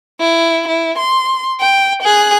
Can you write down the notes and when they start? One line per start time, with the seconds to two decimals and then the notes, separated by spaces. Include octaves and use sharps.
0.20 E4
0.67 E4
0.98 C6
1.60 G5
2.02 G#4 F#6